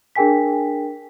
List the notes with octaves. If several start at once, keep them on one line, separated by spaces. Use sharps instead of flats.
D4 G#4 A#4 G5 G#5 B6